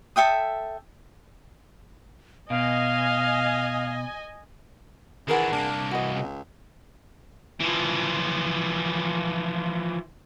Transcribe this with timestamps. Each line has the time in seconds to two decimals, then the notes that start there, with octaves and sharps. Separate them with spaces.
0.16 A4 E5 G5 D#6
2.50 B2 D#5 F5 G#5
5.28 D#3 E3 D4 G#4 A#4 F#5
5.52 C2 A#3 D4
5.91 E3 F#4 D#5
6.14 C#2
7.60 E3 F3